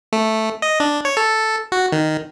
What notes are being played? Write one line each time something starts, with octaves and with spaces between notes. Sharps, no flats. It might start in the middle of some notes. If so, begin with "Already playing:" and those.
A3
D#5
D4
C#5
A4
F#4
D#3